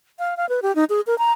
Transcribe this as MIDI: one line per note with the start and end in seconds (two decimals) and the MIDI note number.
0.19 0.37 77
0.37 0.48 77
0.49 0.60 71
0.62 0.74 67
0.76 0.84 63
0.90 1.01 68
1.07 1.17 70
1.18 1.32 82